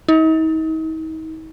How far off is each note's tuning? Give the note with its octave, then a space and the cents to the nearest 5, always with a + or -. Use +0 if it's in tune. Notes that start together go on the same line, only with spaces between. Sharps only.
D#4 +40